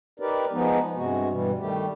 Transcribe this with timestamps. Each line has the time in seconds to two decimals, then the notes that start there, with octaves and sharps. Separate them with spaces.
0.20 D#4 G4 A#4 B4 D5
0.53 F3 G#3 B3 D#4
0.96 G2 C3 G#3 F#4
1.31 G2 B2 E3 G3
1.59 D#3 G3 A3 G4